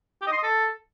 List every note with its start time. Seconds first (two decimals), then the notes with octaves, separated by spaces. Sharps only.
0.22 G4
0.27 D#5
0.32 C6
0.38 D#5
0.43 A4